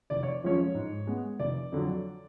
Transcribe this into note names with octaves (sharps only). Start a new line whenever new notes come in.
F1 D5
C#5
F2 F3 G#3 C#4 C#5
G#2
G#3 B3
F1 D5
F2 D3 F#3